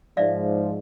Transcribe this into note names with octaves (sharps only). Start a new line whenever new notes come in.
G#2 F3 D5 E5 F5